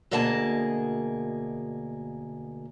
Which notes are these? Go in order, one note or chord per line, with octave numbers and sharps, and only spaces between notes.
D2 B2 A#3 G#4 D#5 A5